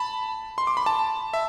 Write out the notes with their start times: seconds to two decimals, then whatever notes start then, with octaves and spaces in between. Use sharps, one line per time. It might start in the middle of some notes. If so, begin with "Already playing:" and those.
Already playing: A5 B5
0.58 C6
0.67 D6
0.77 B5
0.86 A5
1.33 E5